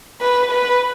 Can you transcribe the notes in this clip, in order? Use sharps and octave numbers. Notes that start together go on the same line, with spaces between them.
B4
B4